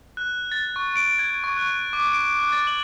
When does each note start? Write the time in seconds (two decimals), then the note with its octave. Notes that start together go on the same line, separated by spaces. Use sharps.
0.17 F#6
0.52 A6
0.76 C#6
0.96 D7
1.19 G#6
1.44 C#6
1.57 F#6
1.93 D6
2.12 D7
2.39 F#6
2.52 A6
2.67 F#7